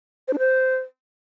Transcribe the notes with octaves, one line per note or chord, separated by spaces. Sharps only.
C5
D4
C5